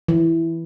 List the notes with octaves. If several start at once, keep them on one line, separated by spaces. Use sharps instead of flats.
E3